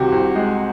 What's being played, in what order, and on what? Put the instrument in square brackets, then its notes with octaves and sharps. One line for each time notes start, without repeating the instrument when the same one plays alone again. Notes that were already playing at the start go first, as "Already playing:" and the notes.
Already playing: [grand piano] C2 C3 D#3 [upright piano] F#4 G4
[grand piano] C2
G#3